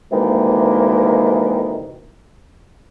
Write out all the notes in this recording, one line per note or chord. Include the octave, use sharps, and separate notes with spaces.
D2 C3 D#3 E3 G#3 A#3